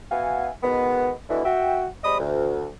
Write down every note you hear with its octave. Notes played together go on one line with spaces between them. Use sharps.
B3 F#4 E5 F5 G#5
B2 D#3 G#3 B3
B2 D3 E3
F#4 E5 G5
C3 G#3 D5 D#5 B5 D#6
D2